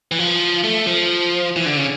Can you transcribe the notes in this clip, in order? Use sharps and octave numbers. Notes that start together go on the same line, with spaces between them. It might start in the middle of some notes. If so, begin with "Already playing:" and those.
E3
F3
A3
F3
E3
D3
C#3